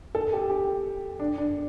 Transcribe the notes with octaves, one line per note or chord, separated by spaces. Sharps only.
A4
G4
G4
D4
D4